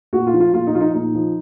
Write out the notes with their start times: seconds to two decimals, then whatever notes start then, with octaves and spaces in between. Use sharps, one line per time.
0.13 A#2 F#4
0.27 F4
0.34 F3
0.40 F4
0.53 A#2 F4
0.67 D#4
0.74 F3 F4
0.81 D#4
0.94 A#2 D#4
1.15 F3